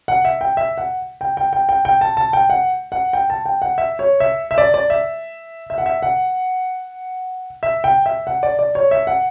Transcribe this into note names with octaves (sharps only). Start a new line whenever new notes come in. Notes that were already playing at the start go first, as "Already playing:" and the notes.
F#5
E5
G5
E5
F#5
G5
G5
G5
G5
G5
A5
A5
G5
F#5
F#5
G5
A5
G5
F#5
E5
C#5
E5
E5
D5
D5
E5
E5
F#5
E5
F#5
E5
G5
E5
F#5
D5
D5
C#5
E5
F#5